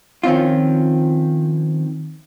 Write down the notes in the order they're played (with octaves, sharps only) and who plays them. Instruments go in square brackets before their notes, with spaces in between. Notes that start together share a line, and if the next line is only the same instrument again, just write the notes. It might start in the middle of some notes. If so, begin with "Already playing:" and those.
[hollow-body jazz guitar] D#3 F3 C4 C#4 F4